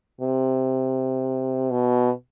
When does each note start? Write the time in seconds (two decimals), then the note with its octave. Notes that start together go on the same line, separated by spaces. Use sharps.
0.21 C3
1.71 B2